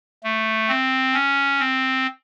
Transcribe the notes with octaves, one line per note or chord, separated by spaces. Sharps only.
A3
C4
C#4
C4